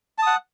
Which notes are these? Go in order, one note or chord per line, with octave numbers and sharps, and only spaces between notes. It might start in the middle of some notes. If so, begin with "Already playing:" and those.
F#5 A5 D#6